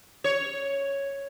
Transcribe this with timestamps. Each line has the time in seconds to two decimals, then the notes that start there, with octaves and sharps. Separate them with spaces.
0.24 C#5